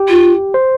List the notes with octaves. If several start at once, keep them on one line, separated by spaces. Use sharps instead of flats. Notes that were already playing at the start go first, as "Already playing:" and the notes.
Already playing: G4
F4
C5